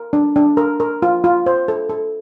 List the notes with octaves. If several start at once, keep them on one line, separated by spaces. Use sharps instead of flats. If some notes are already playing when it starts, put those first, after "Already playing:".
Already playing: A#4
D4
D4
A#4
A#4
F4
F4
C5
A4
A4